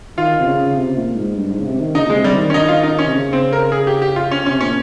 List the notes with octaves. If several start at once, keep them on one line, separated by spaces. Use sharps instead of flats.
D#3 F4
C3
C#3
C3
A#2
G#2
G2
G#2
C#3
C3
D#3
C#3 D#4
A#2 G#3
C3
G3
D#3
C#4
D#4
F4
D#4
C#4
C3
C#3
C4
A#4
G#4
G4
G4
F4
C#4
C#4
C3
A#2 C#4